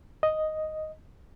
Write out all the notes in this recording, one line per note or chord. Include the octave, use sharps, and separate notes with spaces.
D#5